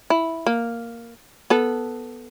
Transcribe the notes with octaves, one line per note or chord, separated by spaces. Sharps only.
E4
A#3
B3 A4